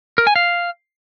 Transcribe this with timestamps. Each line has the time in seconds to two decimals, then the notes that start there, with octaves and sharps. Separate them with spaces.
0.18 A#4
0.27 G#5
0.36 F5